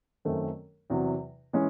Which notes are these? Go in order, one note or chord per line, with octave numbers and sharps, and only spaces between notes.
F#2 D#3 A3 C4
E2 C3 F#3
E3 G#3 C#4